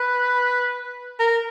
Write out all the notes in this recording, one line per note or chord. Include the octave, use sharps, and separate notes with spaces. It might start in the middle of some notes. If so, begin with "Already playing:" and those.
Already playing: B4
A#4